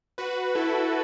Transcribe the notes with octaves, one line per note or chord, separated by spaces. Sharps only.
F#4 B4
E4 A4